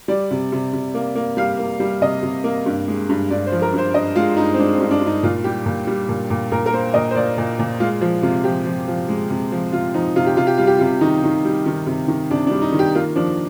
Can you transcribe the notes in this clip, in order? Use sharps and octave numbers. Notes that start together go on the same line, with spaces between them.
G3 D5
C3
C3
C3
A#3
A#3
G3 F5
A#3
G3
C3 D#5
C3
A#3
G2
G#3
G2
G2 D5
C5
F3
A#4
G2
C5
G2 D#5
G#3 F4
G2 D#4
C4
G#3 D4
C4
G2
D4
G2
D#4
A#2 F4
G3 G4
A#2
G3
A#2
A#2
A#2 A#4
A#4
A#3 C5
A#2 D#5
C5
A#2 D5
A#2
A#2
G#3 F4
F3 F4
C3 F4
F3 G4
F3
F3
G#3
C3
F3
C3 F4
F3 D#4
C3 F4
G4
C3 F4
G4
G3 F4
G4
C3 F4
D#3 D#4
D#3
G3
D#3
C3
D#3
C3 D4
D4
G3
D#4
D#3
G4
A#3 F4
F3 D4